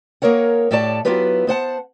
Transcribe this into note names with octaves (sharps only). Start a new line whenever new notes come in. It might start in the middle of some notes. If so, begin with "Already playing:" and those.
A#3 G#4 A#4 C#5 F#5
A2 G4 A4 C#5 D5 A5
F#3 B3 E4 F4 G4 B4
B3 C5 F#5 A5